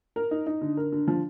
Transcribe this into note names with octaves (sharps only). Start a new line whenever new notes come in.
A#4
D#4
D#4
D3
A#4
D3
F3